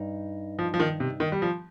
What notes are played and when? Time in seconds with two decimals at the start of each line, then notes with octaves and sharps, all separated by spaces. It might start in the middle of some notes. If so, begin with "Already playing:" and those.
Already playing: G2 D#4
0.59 F3
0.74 F3
0.80 D#3
1.00 C3
1.20 D#3
1.32 G3
1.42 F3